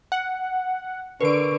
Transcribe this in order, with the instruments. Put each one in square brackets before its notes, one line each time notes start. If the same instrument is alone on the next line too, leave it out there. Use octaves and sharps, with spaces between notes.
[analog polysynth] F#5
[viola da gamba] D3 [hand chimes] A#4 B4 [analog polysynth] C#6 D7